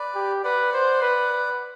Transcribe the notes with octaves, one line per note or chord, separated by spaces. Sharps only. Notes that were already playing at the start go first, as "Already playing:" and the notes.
Already playing: B4 D5
G4
B4 D5 F#5
C5
B4
B4